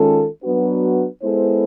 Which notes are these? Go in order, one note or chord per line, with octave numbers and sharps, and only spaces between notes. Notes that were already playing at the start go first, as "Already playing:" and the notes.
Already playing: D#3 G#3 C#4 F4 A4
F#3 B3 D4 F#4 B4
G#3 B3 E4 A4 C5